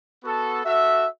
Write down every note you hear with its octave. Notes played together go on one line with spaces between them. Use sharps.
B3 F#4 A4
F#4 A4 E5